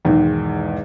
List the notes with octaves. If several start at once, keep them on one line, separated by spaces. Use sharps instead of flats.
B1 E2 G#2 D#3 G#3